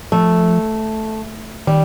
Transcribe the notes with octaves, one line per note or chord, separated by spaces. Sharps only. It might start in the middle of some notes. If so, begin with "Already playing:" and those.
F3 A3
D#3 G3